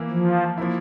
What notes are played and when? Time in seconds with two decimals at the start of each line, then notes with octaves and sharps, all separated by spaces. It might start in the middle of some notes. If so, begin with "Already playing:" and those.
Already playing: E3 A#3 E4
0.11 F3
0.58 F3 A#3 E4